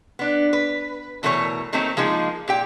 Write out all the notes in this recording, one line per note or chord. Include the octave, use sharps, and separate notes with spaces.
B3 D4
B4
B2 E3 A3 A#4 B4 C#5
D#3 F#3 A3 A#3 C4 D#4
F3 G#3 A#3 D#4 G#4
A#2 G4 G5